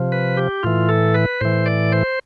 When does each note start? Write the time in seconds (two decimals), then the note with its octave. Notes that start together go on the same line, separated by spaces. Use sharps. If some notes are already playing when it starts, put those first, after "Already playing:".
Already playing: C3 F3
0.12 B4
0.37 G4
0.63 A2 E3 F4
0.89 A4
1.14 B4
1.41 A2 E3 C5
1.66 D5
1.92 C5